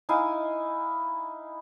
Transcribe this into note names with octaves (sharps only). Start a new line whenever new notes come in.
D#4 E4 F5 G#5